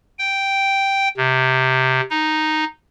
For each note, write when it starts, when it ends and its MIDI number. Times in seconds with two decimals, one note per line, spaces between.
0.18 1.08 79
1.17 2.01 48
2.10 2.65 63